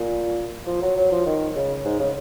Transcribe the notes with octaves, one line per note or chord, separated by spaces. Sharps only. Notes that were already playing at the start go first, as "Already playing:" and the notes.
Already playing: A#2
F3
F#3
F#3
F3
D#3
C#3
G#2
C#3